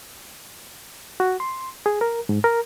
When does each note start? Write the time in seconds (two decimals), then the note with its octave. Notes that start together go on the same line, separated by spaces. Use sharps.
1.20 F#4
1.40 C6
1.86 G#4
2.01 A#4
2.29 G#2
2.44 A#4